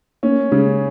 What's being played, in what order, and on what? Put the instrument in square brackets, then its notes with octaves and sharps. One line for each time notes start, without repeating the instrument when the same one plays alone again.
[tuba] A#3 [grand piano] C#4
[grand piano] C#3 [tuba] G#3